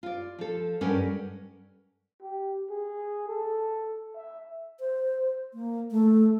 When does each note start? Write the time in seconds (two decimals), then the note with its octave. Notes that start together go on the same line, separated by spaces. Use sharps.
0.03 F4 D5
0.39 F3 A4
0.81 G2 G3 C#4 A4 A#4 F#5
2.21 G4
2.70 G#4
3.28 A4
4.16 E5
4.80 C5
5.54 A#3
5.91 A3